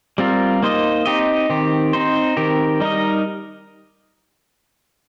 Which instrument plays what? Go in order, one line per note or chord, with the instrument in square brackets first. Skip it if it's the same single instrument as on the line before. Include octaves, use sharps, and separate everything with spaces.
[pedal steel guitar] G3 C4 F4 A#4
A#3 D#4 C5 D#5
C4 D#4 G4 D#5
D#3 C4 G4
C4 D#4 C5
D#3 C4 G4 A#4
G3 D#4 A#4 D#5